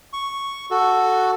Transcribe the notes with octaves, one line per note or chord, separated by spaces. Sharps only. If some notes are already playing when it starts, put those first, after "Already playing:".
C#6
F#4 A4